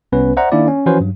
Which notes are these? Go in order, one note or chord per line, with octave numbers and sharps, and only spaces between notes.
C2 B3 C#4 B4
C5 D5 E5 F#5 A#5
D#3 A#3 D4 E4 D5
C#4
E3 F3 C#4 F#4 B4 C5
G2 F#3